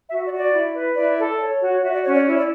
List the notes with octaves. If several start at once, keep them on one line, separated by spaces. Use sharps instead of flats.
F#4 E5
D5
F#4
D5
E4
B4
E4 D5
A4
C#5
F#4
F#4 E5
D5
C#4 C#5
D5
E4 C#5
D5